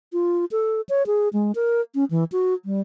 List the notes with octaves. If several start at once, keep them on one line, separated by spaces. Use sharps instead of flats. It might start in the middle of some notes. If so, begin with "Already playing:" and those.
F4
A4
C#5
G#4
G#3
A#4
C#4
E3
F#4
G3